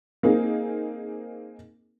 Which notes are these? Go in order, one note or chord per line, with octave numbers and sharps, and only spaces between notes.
A#3 C4 D#4 G#4